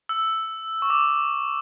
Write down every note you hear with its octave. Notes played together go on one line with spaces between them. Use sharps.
E6
C#6
D6